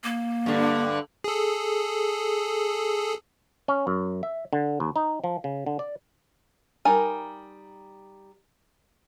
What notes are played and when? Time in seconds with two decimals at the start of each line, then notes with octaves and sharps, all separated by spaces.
0.04 A#3
0.46 G2 D3
1.24 G#4 A4
3.68 C#4
3.87 F#2
4.23 E5
4.53 D3
4.80 D#2
4.96 D#4
5.24 F3
5.44 C#3
5.66 D3
5.79 D5
6.85 G3 D#4 A#4 G#5